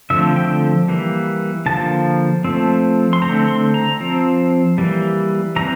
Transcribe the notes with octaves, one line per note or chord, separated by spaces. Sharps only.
D3 F3 A3 C4 E5
G5
E3 G3 A#3
D3 F3 A#3 A5
F3 A3 C4
C6
D3 A3 C4 A#5
C6
A#5
F3 C4
E3 G3 A#3
E3 G3 C4 A#5